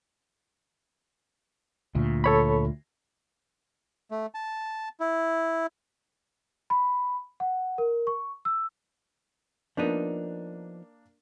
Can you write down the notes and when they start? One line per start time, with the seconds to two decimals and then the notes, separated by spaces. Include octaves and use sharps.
1.95 D2 A#2
2.24 A4 C#5 B5
4.11 A3
4.34 A5
5.00 E4
6.70 B5
7.40 F#5
7.78 A#4
8.07 C#6
8.45 E6
9.77 F3 A#3 B3 D4 D#4